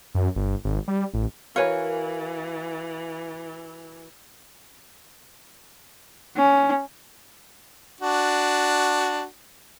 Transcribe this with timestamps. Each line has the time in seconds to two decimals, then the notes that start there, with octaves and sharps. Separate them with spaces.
0.15 F#2
0.36 G1
0.65 G#1
0.88 G3
1.14 A1
1.56 E3 F#4 A#4 B4 C#5 F5 G#5
6.36 C#4
8.01 D4 F#4